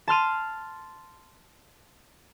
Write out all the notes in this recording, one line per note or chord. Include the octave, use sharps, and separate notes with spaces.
A5 C6 F6 D#7